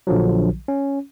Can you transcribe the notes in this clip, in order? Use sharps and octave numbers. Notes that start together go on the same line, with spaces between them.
A#1 D3 F3 F#3
C#4